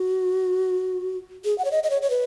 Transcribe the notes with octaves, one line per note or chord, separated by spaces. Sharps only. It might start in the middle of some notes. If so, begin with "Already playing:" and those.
Already playing: F#4
G#4
F#5
C#5
D#5
D#5
C#5
C#5
B4